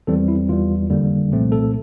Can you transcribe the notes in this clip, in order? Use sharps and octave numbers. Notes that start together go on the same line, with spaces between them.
E2 E3 G3 C4 A4
E4
E2 E3 G3 F4
G1 F2 D3 G3 A#3
C2 A#2 F3 A3 C4
A4